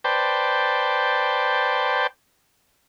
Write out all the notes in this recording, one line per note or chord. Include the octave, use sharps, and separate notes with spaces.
B4 C5 D5 G5 A5